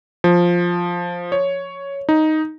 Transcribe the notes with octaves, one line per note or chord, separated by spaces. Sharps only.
F3
C#5
D#4